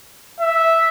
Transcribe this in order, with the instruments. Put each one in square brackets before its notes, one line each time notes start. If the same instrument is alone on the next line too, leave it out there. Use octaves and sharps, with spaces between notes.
[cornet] E5